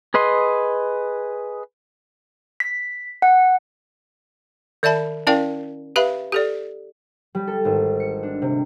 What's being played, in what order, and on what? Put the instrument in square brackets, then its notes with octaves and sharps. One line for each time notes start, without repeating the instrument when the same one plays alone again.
[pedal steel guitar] G#4 B4 D#5 C6
[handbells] B6
F#5
[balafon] D#3 D5 E5 A5 B5
C#4 E4 A#4 D5 F5 G5
G4 B4 E5 F5 B5
G4 A4 D5
[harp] G3
A4
G#1
C#7
D4
C3